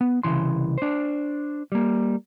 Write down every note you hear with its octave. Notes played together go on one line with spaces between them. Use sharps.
B3
C2 C#3 E3 C6
D4 C5
G3 A#3